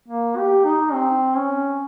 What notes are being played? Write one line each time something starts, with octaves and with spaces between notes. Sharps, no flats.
A#3
G4
D#4
C4
C#4